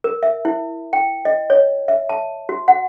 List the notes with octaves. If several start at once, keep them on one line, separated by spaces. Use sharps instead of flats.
A#4
E5
E4
G5
D#5
C#5
E5
A5
F#4
F#5